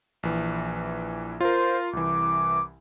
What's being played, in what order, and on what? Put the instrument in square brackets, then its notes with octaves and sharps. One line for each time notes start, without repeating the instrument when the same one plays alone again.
[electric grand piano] A#1 E3
[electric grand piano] F4 A#4 [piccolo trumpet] C5
[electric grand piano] C2 E3 [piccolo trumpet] D6